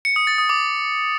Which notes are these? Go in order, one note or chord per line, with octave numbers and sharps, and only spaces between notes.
C#7
D#6
A6
D#6
D6